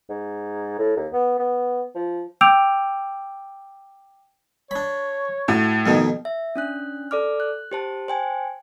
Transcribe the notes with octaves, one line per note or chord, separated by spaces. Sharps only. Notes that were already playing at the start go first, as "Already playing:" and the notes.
G#2
A2
D#2
B3
B3
F3
G5 D6 E6 G6 D7 F7
D4 C#5 B5
A2 F#4
F2 B2 D#3 D#4
E5
C#4 D4 F#6
A4 D5 D6 F6
F#6
G4 C5 A5
C5 G5 G#5